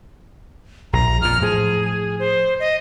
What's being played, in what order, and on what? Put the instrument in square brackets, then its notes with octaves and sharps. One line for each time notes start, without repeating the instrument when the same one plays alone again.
[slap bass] A#1 [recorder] A#5
[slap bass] F2 A#2 [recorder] F6
[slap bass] A2 F3 [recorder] G#4
[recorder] C5
D#5